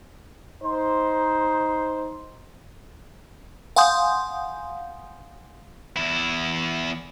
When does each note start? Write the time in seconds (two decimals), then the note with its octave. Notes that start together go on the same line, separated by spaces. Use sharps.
0.64 D#4 C5
3.76 F5 F#5 G#5 C6 D#6 G6
5.97 E2 E4